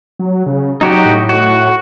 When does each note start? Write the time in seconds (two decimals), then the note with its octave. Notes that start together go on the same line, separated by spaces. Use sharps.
0.19 F#3
0.46 C#3
0.81 F#3 D#4 F#4 G4
1.05 A2
1.29 F#4